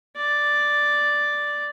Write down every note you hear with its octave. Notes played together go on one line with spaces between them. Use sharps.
D5